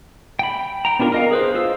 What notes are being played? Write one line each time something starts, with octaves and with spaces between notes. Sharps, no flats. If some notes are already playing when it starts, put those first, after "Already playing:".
G5 B5
G5 A#5
B3 D4 F4 F#4 A#4
A#4 D#5 F5
G#4 B4 C5
F4 C5 F5 E6